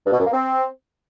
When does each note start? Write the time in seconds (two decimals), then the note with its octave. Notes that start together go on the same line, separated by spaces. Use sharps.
0.06 G2
0.13 B2
0.20 F#2
0.26 A#3
0.33 C4